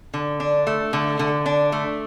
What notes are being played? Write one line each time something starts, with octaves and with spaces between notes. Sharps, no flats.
D3
D4
A3
D3
D3
D4
A3